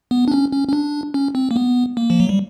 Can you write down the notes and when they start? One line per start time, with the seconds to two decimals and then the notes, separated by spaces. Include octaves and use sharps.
0.11 B3
0.28 D4
0.32 C#4
0.52 C#4
0.68 C#4
0.73 D4
1.14 C#4
1.35 C4
1.51 A#3
1.56 B3
1.97 A#3
2.10 F3
2.20 F#3
2.29 G3